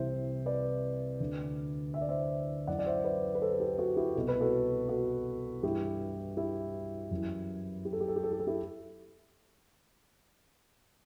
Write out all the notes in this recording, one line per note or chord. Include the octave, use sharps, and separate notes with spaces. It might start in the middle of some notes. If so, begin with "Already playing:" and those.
Already playing: C2 C3 E3 C5 E5
B4 D5
D2 D3
E5
D5
C5 E5
F#2 E3 D5 F#5
D5
C5 E5
B4 D5
B4
A4 C5
A4
G4 B4
F#4 A4
E4 G4
C2 B2 A4
B4
F#4 A4
F#4 A4
G2 E3 E4 G4
E4 G4
F#2 E3
G4
A4
G4
A4
G4
A4
G4
A4
E4 G4